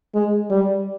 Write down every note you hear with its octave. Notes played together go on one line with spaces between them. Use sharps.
G#3
G3